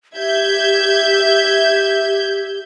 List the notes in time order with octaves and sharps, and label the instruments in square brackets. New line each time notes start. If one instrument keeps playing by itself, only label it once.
[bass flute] G4 [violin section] E5 G6 G#6